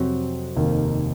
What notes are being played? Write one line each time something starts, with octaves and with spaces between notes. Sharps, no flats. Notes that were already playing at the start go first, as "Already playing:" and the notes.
Already playing: F2 C3 F#3 C4 F#4
F1 D#2 D#3 A#3